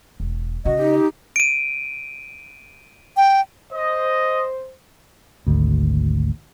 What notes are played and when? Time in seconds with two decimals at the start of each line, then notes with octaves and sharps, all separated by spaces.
0.20 E1
0.65 C#3 F#4 D#5
0.79 D#4 G4
1.36 D7 D#7
3.17 G5
3.72 C5 D#5
5.47 G#1 D2